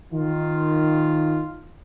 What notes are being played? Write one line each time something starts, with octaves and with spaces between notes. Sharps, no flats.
D#3 F4